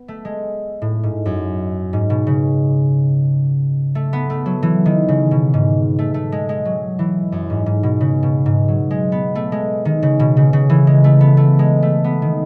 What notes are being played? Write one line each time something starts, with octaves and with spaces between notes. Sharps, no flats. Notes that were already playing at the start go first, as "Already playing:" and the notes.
Already playing: B3
A3
G#3
A2
G#2
F#2
G#2
B2
C#3
A3
B3
A3
F#3
E3
D#3
C#3
B2
G#2
A3
A3
G#3
G#3
F#3
E3
F#2
G#2
G#2
B2
C#3
B2
G#2
F#3
G#3
B3
A3
G#3
D#3
C#3
B2
C#3
C#3
E3
G#3
A3
B3
A3
G#3
A3
B3
D#3